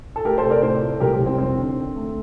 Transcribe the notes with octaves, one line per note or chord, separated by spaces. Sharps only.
A4
A3 G4 A#4
A4 C5
C3
A#4 D5
A2 A4 C5
A2
C2 G4 A#4
G4 A#4
C2
C4
F2 C4
D3
D3
A3